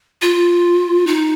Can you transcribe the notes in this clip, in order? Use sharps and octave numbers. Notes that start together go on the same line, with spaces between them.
F4
D#4